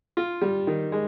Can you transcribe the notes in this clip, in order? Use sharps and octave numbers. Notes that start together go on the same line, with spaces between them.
F4
G3
D#3
G#3